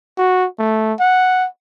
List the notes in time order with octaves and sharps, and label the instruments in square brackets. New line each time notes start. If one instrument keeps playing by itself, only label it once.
[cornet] F#4
A3
F#5